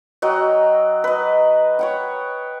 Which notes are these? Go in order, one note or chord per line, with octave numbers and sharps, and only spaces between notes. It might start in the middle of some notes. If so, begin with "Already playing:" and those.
F#3 F#4 D#5 G5
B4 D#5
C#5 F#5 G5